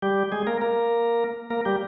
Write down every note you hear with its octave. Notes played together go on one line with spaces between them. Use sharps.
G3 G4
G#3 G#4
A#3 A#4
A#3 A#4
A#3 A#4
G3 G4